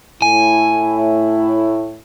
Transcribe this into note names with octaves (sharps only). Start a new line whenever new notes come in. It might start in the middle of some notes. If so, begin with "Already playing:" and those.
A2 E4 G#5